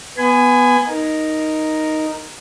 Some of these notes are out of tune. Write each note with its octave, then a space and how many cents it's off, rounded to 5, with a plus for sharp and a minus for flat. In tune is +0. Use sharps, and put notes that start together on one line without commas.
B3 +0 G#5 +0 B5 +35
D#4 +0 A#4 +0